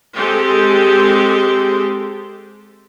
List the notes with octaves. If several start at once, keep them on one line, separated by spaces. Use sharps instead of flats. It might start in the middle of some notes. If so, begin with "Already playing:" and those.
G#3 C4 G4 A4 C5